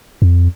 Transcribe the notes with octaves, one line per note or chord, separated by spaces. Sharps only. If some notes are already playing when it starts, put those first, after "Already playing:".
F2